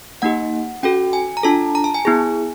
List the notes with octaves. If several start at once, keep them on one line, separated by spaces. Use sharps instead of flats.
A#3 D#4 G4 F#5
C#4 F#4 A4 G5
G#5
A#5
D4 F4 A4 A5
A#5
A5
G#5
B3 E4 G#4